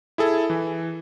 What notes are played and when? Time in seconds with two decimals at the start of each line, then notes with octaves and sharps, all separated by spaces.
0.18 E4 G#4 A4
0.50 E3